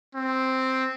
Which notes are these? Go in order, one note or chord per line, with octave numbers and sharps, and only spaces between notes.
C4